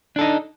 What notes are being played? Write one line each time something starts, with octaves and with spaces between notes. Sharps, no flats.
D4 D#4 A4